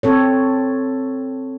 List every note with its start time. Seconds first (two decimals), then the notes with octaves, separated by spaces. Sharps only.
0.03 C4 A4 C#5